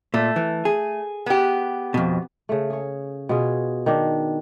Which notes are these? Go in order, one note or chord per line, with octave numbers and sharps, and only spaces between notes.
A#2 A3
E3
G#4
B3 G4
F2 B2
C#3 A3
G#4 C#5
B2 F4 G#4
D#3 D4